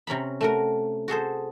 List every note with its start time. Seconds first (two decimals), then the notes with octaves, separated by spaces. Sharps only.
0.07 C3 C#4 A#5 B5
0.41 A3 F#4 A#4
1.08 F#4 G#4 A4 C5